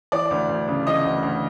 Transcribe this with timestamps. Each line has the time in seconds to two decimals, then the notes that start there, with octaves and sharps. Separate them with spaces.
0.12 E3 D5
0.31 D2
0.49 D2
0.68 C#3
0.86 E3 D#5
1.05 D2
1.23 D2